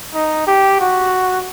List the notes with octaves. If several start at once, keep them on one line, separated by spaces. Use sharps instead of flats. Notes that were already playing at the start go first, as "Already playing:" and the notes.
D#4
G4
F#4